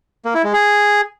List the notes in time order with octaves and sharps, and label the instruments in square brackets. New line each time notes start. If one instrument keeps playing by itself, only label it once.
[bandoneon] A#3
E4
G#3
G#4